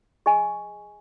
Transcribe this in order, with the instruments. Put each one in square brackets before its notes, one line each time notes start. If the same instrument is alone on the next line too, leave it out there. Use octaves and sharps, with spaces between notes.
[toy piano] G#4 D#5 G#5 C#6